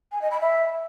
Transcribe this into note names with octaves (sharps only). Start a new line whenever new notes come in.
G#5
D#5
B5
E5